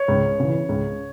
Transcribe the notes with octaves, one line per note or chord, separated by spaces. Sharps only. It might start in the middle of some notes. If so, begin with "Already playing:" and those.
Already playing: C#5
C#2
C#3 E3
C#2